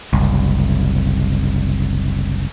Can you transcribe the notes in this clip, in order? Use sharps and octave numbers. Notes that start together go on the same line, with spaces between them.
F#1 C2